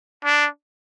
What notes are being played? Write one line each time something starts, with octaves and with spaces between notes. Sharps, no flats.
D4